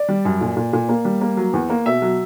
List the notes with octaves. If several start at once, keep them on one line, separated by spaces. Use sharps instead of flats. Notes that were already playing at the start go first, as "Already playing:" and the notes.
Already playing: D5
G3
F#2
A#2
A#2
A#2
A#3
G3
A#3
F#3
E2
A#3
B2 E5
F#3